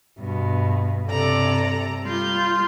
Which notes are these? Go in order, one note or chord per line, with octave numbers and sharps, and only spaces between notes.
G2 B2
G2 C3 A4 D5 A#5
G3 F4 C6 G6